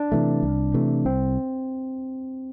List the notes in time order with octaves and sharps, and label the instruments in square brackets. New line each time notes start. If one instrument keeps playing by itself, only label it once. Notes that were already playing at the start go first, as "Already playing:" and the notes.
Already playing: [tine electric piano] D4
[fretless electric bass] C3 E3 A3
C2
C3 E3 A3
[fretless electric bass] C2 [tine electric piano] C4